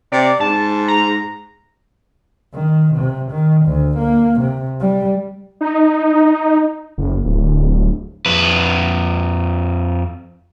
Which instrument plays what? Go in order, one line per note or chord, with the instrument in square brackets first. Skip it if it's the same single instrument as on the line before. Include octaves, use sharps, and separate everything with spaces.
[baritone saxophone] C3 [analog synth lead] D5
[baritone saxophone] G#2 [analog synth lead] A5
[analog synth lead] A#5
[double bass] D#3
C3
D#3
D2
A#3
C3
G3
[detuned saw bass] D#4
F#1
D1
[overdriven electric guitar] F2 B4